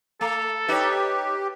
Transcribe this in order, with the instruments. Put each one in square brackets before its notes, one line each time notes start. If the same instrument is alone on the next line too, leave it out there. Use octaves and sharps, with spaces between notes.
[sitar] A3 [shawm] A4
[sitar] D#4 C#5 [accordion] G4 [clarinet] B4